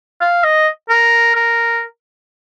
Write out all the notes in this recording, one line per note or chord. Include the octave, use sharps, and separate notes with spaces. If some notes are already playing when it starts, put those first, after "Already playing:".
F5
D#5
A#4
A#4